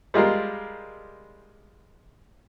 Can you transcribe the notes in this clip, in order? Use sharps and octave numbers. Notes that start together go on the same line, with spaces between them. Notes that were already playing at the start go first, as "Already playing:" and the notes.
G3 G#3 F4 A#4